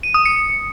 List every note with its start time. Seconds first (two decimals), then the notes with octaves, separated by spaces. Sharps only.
0.03 D#7
0.14 D#6
0.25 C#7